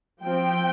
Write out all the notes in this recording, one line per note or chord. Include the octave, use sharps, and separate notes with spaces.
F3 C4 G5